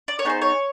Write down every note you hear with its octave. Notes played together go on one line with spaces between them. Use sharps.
D5
C#5
B3 D#4 G#4 C5
C#5